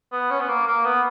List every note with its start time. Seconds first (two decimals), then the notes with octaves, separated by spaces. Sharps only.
0.12 B3
0.31 C#4
0.41 B3
0.49 A#3
0.67 A#3
0.85 B3